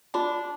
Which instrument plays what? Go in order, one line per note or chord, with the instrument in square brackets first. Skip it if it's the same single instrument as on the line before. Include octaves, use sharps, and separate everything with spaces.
[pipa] D4 [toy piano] F4